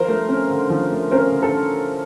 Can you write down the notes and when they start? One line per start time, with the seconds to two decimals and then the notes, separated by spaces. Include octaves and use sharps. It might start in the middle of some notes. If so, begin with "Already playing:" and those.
Already playing: F3 A#4 C5
0.08 A3
0.29 C#4
0.50 D3
0.70 F3
0.91 A3
1.11 C#4 A#4 C5
1.32 D3
1.42 A4